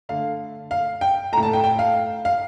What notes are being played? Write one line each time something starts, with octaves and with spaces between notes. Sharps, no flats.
D3 A3 F5
F5
G5
A2 A3 A#5
A5
G5
G5
F5
F5